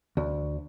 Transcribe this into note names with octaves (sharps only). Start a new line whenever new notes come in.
D2